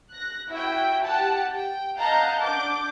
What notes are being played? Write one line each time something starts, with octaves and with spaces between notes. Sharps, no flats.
F#6 A#6
E4 F#4 E5 G5
G4 F#5 A5
G5
D#5 F5 F#5 A5 A#5 G6
D4 D6 G6